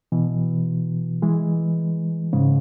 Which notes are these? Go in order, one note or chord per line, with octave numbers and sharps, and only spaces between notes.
B2 E3
E3 G#3
G#2 C#3